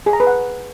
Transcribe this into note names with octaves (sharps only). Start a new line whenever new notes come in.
G#4
A#5
B4
F#5